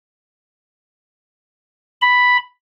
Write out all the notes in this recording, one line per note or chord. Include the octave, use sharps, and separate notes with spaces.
B5